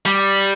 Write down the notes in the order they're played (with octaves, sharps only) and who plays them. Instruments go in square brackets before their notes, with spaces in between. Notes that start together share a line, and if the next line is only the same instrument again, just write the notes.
[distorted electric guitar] G3